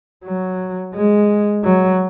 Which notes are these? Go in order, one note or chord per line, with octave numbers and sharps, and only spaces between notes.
F#3
G#3
F#3